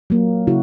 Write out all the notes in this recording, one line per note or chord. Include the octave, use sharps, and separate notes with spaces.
F#3 A#3
C#3 E4 F#4